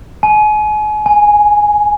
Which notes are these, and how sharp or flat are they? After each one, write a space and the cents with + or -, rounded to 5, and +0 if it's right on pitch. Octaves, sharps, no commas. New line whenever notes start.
G#5 +35
G#5 +0